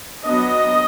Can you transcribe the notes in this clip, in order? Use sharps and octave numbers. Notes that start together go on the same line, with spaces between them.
F#3 B3 D4 D#5